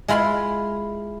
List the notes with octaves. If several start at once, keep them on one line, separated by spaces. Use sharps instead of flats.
G#3 E4 F4 B5 C6